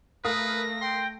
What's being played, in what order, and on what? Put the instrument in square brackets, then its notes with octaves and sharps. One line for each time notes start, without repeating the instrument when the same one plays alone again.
[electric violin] A3 A#6 [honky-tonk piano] A#4 F5 D#6 [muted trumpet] B4
[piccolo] G5 [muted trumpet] C6